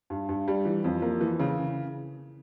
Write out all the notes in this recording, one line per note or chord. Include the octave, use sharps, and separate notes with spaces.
G2
G2
G3
E3
F2
A#3
E3
C#3